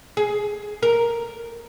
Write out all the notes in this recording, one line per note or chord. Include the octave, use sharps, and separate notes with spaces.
G#4
A#4